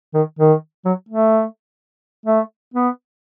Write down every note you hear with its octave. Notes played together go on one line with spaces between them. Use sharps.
D#3
D#3
F#3
A3
A3
B3